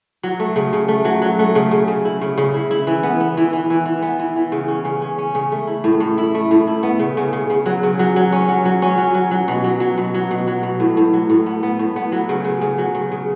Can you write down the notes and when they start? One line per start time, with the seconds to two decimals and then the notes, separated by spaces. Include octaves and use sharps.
0.23 F#3
0.39 A3
0.56 C#3
0.73 C#3
0.88 A3
1.05 F#3
1.22 F#3
1.39 A3
1.55 C#3
1.71 C#3
1.88 C#3
2.05 E4
2.21 C#3
2.38 C#3
2.54 E4
2.71 E4
2.87 E3
3.03 B3
3.20 B3
3.37 E3
3.53 E3
3.70 E3
3.86 E3
4.02 B3
4.19 E3
4.36 E3
4.52 C#3
4.68 C#4
4.85 C#3
5.02 C#4
5.18 C#4
5.35 C#3
5.52 A3
5.67 E4
5.84 A2
6.00 A2
6.18 E4
6.35 A3
6.51 A2
6.67 E4
6.83 B3
6.99 C#3
7.17 C#3
7.33 C#3
7.50 C#3
7.66 F#3
7.83 C#3
7.99 F#3
8.16 F#3
8.32 C#4
8.49 F#3
8.65 F#3
8.82 C#4
8.98 F#3
9.15 F#3
9.31 F#3
9.48 B2
9.64 F#3
9.80 F#3
9.98 B2
10.14 F#3
10.31 B2
10.47 F#3
10.63 B2
10.80 A2
10.97 A2
11.13 F#3
11.30 A2
11.46 B3
11.63 B3
11.79 A2
11.96 B3
12.12 F#3
12.29 C#3
12.44 C#3
12.61 C#3
12.78 F#3
12.95 C#3
13.12 C#3